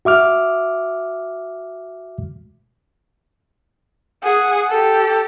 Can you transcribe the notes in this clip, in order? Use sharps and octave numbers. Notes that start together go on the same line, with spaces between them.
F#4 E5 D6 F6
G#4 F#5
G4 A4